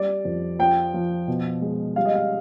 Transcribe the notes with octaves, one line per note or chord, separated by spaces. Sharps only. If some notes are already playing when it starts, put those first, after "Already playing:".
Already playing: G3 D5
F2
F3 G5
F3
B2
G#3
G3 F5
D#5
F5